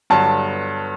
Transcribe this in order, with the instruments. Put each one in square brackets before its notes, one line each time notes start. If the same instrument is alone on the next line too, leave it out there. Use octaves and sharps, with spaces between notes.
[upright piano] G1 G2 F#3 A5